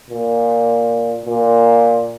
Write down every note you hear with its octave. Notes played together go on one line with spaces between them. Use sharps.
A#2
A#2